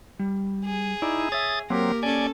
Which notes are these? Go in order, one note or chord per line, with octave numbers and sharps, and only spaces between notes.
G3
G#4
D#4 E4 D5
C#5 E5 D#6 A6
F#3 A#3 C4 G4 A#4
C#4 A4 D5 G#5